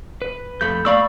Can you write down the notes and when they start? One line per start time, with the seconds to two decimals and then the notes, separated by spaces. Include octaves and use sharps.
0.22 B4
0.61 F2 A3 B5 G6
0.85 A3 D5 F5 B5 C#6 E6